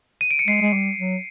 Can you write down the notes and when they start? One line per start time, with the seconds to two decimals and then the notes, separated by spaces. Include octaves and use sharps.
0.21 D#7
0.31 D7
0.39 C#7
0.48 G#3 C7
0.62 G#3
0.73 G3
0.98 F#3